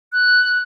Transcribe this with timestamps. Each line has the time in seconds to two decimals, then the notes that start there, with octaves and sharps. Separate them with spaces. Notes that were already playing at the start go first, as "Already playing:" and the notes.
0.12 F#6